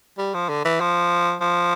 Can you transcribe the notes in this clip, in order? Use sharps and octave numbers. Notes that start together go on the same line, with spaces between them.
G3
F3
D3
E3
F3
F3